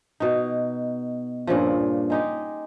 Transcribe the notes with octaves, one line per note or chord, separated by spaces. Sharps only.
B2 D#4
G2 A#2 C#3 F3
G#3 D#4 G4